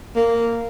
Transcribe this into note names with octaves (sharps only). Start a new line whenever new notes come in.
A#3